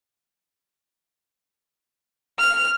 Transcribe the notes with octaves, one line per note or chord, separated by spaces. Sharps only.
F6